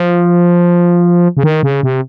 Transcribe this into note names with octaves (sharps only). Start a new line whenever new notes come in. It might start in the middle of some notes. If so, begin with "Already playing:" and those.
Already playing: F3
C#3
D#3
C#3
C3